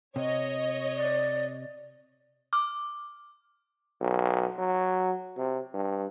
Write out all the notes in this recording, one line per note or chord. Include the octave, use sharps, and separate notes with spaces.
C3 C#5 D#5
D5
D6 F6
B1
F#3
C3
G2